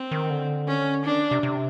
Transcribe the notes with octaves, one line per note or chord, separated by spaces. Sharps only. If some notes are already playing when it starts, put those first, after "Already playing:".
Already playing: C4
D#3
D3
C#4
D#3 D4
C3
C3